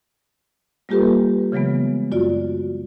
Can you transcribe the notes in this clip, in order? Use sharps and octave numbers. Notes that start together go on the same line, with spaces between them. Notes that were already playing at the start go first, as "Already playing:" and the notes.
G3 A#3 F4 G4 A4 B4
C#3 E3 F#3 G#3 B3
F#2 F4 F#4 D5